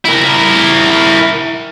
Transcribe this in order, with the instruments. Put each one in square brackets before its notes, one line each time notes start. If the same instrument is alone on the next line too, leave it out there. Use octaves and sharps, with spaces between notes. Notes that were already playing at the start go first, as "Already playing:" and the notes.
[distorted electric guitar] E4 A#4